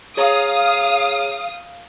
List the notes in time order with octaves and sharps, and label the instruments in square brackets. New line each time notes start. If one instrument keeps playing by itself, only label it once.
[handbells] G#4 C#5 A#5 [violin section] F5 D#6